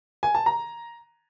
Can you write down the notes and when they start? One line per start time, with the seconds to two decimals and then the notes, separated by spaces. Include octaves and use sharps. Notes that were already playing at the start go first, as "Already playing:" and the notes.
0.23 G#5
0.35 A5
0.46 A#5